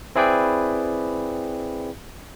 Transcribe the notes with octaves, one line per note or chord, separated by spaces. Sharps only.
C4 E4 G#4 B4 D5 G5